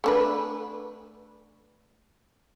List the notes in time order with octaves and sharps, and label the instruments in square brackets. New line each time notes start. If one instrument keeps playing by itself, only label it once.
[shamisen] A3 D4 B4